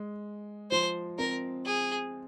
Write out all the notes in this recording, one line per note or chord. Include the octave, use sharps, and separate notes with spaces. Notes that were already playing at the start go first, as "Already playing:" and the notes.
Already playing: G#3
F3 C5
C4 A#4
G#4